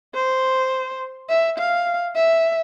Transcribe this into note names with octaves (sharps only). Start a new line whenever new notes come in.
C5
E5
F5
E5